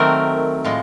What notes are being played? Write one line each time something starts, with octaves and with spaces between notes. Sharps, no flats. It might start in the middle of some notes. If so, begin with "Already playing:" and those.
Already playing: D#3 F#3 A3 C4 A#4
A2 F3 G#3